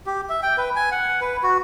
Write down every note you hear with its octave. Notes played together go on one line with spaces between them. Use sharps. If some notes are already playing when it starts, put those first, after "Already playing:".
G4
E5
G5
B4
G#5
F#5
B4
F#4